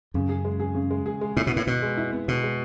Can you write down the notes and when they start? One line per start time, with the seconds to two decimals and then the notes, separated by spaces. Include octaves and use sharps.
0.14 F#2 C#3
0.29 G#4
0.45 G#3
0.60 G#4
0.75 C#3
0.91 G#3
1.06 G#4
1.21 G#3
1.36 A2 E4
1.47 B2
1.51 A2 B3
1.67 B2 B3
1.82 G#3
1.97 E4
2.12 B3
2.28 B2 G#3
2.43 G#3